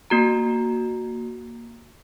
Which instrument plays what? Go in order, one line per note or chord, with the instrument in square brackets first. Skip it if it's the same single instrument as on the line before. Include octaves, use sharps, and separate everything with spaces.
[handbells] A#3 F#4 A#5